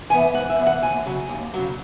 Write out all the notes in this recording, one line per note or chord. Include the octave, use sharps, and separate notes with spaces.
E3 B3 G#5
G#2 F#5
E5
E3 B3
F#5
D#2 G#5
C#3 F#3
D#2
C#3 F#3